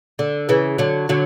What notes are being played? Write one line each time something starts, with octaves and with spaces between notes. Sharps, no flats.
D3
C#3 E3
D3 F#3
D3 F#3